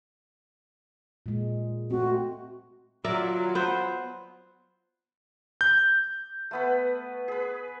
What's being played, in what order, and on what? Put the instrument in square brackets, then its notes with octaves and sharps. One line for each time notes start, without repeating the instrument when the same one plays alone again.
[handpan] A#2 G#3
[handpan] A3 C4 [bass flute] F#4
[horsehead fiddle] F#3 F4 [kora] A#4 D5 E5
[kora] B3 C5
[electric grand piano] G6
[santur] A3 B3 B4
G#4 B4